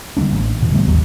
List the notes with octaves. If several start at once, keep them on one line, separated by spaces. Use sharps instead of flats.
D3 G3 A#3 D4
A1
E1 A#2 E3
D3 G3 A3 B3
G#1 D#2 F#3